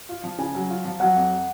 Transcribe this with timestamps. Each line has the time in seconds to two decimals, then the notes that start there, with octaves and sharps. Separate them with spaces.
0.09 F4
0.24 F3
0.38 C#3 G#5
0.55 F#3
0.70 F4
0.85 F3
1.00 F#3 F#5
1.16 F2